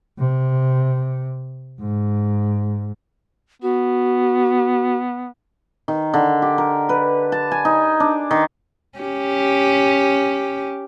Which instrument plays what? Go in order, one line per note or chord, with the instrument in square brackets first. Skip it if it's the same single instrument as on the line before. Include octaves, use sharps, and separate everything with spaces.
[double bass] C3
G#2
[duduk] B3 [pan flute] F#4
[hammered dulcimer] D#3
D3
G4
A#4
B4
A5
G#5
D#4
D4
D#3
[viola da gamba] C#4 G4